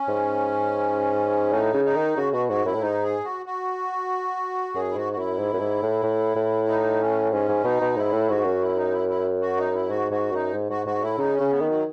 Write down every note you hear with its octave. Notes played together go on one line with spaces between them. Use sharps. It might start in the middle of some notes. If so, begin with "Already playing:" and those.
Already playing: C#4
G#2
A2 D#4
C#3
D#4
D#3
C#3 F#4
B2 F#4
G#2 F#4
F#2 E4
A2
G#2 D#4
G#4
F#4
F#4
F#2 G#4
E4
G#2 F#4
F#4
F#2 E4
G#2
F#2
G#2
A2
A2
A2
D#4
C#4
G#2 C#4
G#2
B2 D#4
B2
G#2 E4
A2
G#2 F#4
F#2
E4
D#4
E4
E4
F#4
D#4
E4
G#2 F#4
G#2 F#4
F#2 D#4
G#2
G#2 F#4
G#2 F#4
A2 E4
C#3 D#4
C#4
C#3
B3
D#3
F#3